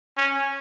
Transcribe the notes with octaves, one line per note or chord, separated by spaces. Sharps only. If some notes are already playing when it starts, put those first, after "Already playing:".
C#4